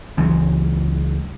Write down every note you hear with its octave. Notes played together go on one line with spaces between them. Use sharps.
C#2 E3 F#3 G#3